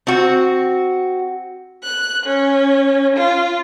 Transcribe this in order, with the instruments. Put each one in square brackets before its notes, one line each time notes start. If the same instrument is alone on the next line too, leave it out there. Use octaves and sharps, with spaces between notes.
[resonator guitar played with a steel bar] C4 F#4
[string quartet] F#6
C#4
F4